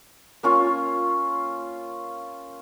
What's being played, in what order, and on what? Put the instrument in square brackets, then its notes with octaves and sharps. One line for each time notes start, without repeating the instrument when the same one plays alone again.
[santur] A#3 C#4 F4